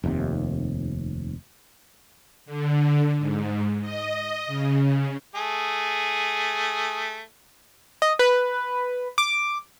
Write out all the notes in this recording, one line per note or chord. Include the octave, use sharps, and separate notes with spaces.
F1 D#2 A2 C3
D3
G#2
D#5
C#3
A3 G#4
D#5
B4
D6